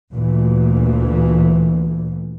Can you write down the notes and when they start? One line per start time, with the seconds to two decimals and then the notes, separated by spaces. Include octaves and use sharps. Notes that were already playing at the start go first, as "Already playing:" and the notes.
0.14 D2 A#2 E3